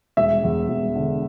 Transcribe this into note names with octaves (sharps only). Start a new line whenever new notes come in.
E1 E5
E2
E1
D3